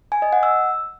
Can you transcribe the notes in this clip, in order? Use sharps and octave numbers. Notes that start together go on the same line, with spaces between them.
G#5
D#5
F#5
E6